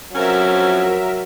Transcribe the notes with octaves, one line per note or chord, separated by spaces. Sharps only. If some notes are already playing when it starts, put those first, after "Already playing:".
F2 F3 F#3 C#4 A#4 E5